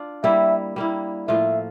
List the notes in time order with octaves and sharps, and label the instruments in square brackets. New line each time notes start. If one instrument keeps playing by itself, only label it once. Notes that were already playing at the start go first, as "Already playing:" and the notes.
Already playing: [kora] D4 F4
[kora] G3 A#3 E4 [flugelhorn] E5
[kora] G3 A#3 E4
[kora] A2 F3 A#3 F4 [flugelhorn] E5